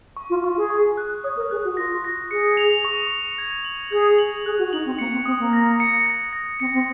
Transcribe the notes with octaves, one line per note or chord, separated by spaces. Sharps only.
C#6
F4
F4 C#6
G#4
C#6
F#6
C#5 D#6
A#4
G#4 F#6
F#4
F4 A#6
A#6
G#4 C#7
F7
C#6
C#7
G#6
F#7
G#4 G#6
F#7
G#4 F#6
F#4
D#4 F#7
C4
A#3 C#7
C4
C4 D#6
A#3
A#6
C#7
A#6
A#6
C4 C#7
C4